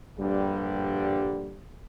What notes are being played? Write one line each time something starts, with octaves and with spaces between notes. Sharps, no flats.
A#1 G2 D3 G3